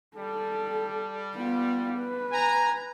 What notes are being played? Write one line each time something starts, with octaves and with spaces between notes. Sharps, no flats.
G3 A4
B3 F4
B4
G#5 A#5